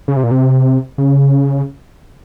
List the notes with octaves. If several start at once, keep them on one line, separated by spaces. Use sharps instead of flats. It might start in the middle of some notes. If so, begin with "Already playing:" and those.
C#3
C3
A#2
C3
C#3